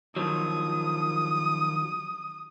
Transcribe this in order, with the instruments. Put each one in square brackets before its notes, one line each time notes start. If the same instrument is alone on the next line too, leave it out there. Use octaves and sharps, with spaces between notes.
[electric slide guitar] D#3 F3 F#3 [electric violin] D#6